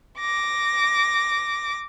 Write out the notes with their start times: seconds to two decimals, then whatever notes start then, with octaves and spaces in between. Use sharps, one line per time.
0.19 D6 A#6